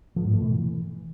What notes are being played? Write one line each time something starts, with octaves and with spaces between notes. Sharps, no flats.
F3
G#2
A3
B2
E3